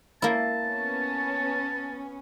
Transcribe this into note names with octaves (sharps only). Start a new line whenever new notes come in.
A#3 E4 A5
B3 C#4